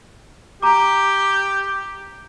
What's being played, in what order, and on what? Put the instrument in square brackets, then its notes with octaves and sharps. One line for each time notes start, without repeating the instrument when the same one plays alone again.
[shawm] G4 [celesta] A#5 D6